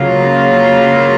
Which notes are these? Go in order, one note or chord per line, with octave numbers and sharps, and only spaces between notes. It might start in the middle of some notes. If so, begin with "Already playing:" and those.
Already playing: C#3 F#3 A#3 F4